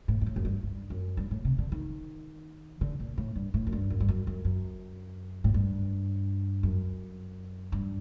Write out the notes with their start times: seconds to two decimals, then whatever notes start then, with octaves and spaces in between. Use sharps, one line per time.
0.08 A2
0.21 G2
0.26 A2
0.36 F#2
0.45 G2
0.63 G2
0.90 F#2
1.17 G2
1.31 A2
1.45 C3
1.58 D3
1.72 D#3
2.81 D3
3.00 A#2
3.18 A2
3.36 G2
3.54 A2
3.67 F#2
3.72 G2
3.90 F#2
4.00 G2
4.09 F#2
4.27 F#2
4.45 F#2
5.44 A2
5.54 G2
6.63 F#2
7.72 G2